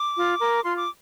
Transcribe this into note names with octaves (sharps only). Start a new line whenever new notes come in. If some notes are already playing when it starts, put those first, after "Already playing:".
Already playing: D6
F4
A#4
F4 C6
D6